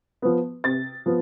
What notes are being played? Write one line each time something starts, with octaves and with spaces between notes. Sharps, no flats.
F3 B3
C3 A6
F3 B3